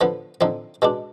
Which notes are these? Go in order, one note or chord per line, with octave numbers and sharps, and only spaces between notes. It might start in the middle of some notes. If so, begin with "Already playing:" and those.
D3 F3 B3
D3 F3 C4 D#4
B2 G#3 D4